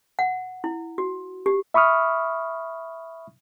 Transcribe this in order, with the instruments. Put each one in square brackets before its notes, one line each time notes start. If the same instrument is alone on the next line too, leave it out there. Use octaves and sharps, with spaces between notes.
[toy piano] F#5
E4
F#4
G4
[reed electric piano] E5 B5 C#6 D#6 F6